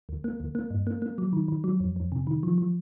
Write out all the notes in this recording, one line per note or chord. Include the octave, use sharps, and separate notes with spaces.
D2
A#3
D2
A#3
G2
A#3
A#3
F#3
D#3
D#3
F#3
F2
F2
C3
D#3
F3
F3